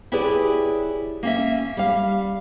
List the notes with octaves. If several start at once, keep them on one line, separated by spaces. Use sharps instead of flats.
E4 G4 G#4 B4 C#5 D5
A#3 C#4 E5
G3 F5